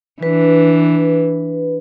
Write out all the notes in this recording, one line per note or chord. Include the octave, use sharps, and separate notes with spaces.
E3 D4 B4